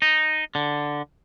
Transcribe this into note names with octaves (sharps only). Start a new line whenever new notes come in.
D#4
D3